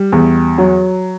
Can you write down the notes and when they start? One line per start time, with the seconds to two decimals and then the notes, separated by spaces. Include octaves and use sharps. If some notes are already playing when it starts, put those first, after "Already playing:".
Already playing: G3
0.12 E2
0.58 F#3